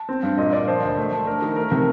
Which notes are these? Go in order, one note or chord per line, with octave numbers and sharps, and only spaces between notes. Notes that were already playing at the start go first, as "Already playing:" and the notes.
Already playing: A5
C4
G2
A#2 D#5
A#2 D5
F3 C5
D2
A3
A3
D4 A#4
D#3
A3 A#4
C3 A#4